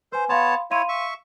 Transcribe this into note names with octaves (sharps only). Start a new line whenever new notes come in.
B4 C5 G#5
B3 C#5 F5 A5 B5 C6
E4 C#5 F5 C6 D#7
E5 C#6